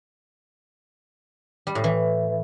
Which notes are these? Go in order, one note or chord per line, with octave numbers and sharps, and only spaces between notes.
G3
A2
E3